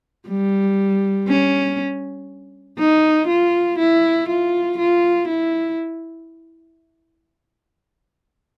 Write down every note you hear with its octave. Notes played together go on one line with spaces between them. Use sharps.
G3
C#4
D#4
F4
E4
F4
F4
E4